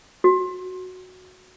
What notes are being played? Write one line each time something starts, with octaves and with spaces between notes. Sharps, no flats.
F#4